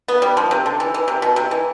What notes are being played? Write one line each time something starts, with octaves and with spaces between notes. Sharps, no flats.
B3
G3
F3
C3
D3
E3
E3
C3
B2
C3
E3